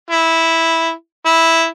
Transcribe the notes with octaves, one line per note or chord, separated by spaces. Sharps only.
E4
E4